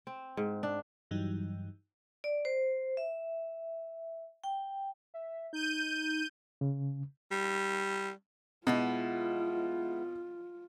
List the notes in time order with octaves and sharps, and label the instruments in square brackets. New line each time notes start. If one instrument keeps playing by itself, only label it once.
[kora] C4
G#2
D4
[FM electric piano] G2 E3 F#3 G3 D#4
[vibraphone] D5
C5
E5
G5
[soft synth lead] E5
[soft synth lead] D#4 [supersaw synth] G6 D#7
[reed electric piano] C#3
[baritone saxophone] G3
[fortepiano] B2 [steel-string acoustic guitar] G#3 B3 E4 [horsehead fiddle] F4